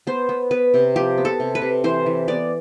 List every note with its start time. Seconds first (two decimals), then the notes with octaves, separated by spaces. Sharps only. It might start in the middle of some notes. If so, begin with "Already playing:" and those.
0.07 B3 C5
0.29 B3
0.51 B3 B4
0.74 C3
0.96 F3 G4
1.18 B3
1.25 A4
1.40 C3
1.55 B4
1.62 C3
1.84 E3 C5
2.06 E3
2.28 B3 D5